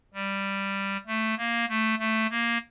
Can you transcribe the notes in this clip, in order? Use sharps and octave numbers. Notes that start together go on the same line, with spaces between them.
G3
A3
A#3
A3
A3
A#3